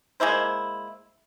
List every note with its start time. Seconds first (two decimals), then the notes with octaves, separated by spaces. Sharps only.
0.20 G#3 A#3 E4 C5